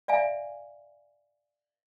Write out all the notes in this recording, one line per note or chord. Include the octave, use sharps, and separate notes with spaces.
D5 E5 F5 G#5